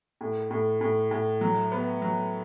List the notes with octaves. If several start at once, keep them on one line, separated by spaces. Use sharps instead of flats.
A2
A2
A2
A2
F#3
B3
F#3